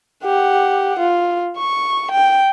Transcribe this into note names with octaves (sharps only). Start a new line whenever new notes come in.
G4 F#5
F4
C#6
G5